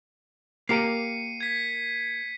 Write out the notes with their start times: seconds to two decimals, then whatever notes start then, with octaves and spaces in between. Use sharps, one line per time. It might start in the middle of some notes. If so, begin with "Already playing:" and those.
0.69 A#3 G4 A#4 C7 C#7 D#7
1.40 G#6 B6